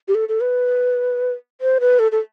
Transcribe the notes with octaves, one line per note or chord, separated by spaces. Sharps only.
G4
A4
A4
B4
C5
B4
A4
A4